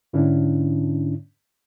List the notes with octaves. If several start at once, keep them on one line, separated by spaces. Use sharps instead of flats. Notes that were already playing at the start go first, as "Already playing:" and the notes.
G#2 D3 C#4 D4 E4